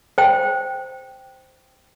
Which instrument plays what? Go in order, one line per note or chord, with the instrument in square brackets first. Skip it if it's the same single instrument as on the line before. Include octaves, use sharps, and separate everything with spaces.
[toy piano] C5 G5